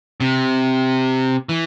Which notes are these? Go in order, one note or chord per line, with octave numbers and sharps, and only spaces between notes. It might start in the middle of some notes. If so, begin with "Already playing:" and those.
C3
E3